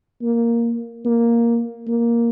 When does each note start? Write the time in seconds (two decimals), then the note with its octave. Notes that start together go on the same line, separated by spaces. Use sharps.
0.22 A#3
1.05 A#3
1.87 A#3